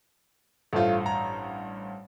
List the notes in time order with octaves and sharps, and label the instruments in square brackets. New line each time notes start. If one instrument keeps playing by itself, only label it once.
[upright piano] A1 G2 C5 [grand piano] A3 F4
[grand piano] A#5